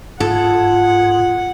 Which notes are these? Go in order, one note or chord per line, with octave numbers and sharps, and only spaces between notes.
G#2 F4 A4 F#5